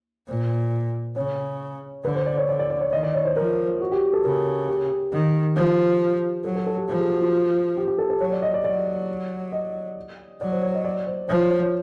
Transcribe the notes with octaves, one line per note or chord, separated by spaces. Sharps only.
A#2 C5
C#3 C#5
D3 B4
C5
D5
C#5
D3 D5
D5
D5
C#5
D#3 D#5
D5
C#5
C5
F3 A#4
F#4
G4
A4
C#3 A#4
G4
D#3
F3
F#3 A4
A4
A4
G4
F3
G#4
F#4
F4
G4
G4
A4
A4
F#3 C#5
D5
D#5
D5
F#3 D5
D#5
F#3 D5
C5
C#5
D#5
D5
C5
F3 C#5
C#5
C5
C#5